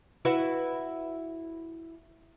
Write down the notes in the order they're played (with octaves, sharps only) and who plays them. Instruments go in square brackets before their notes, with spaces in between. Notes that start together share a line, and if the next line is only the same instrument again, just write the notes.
[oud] E4 F#4 B4